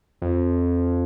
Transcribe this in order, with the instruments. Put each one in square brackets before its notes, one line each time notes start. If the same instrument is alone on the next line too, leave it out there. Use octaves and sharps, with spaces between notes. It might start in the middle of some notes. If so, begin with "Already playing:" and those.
[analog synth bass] F2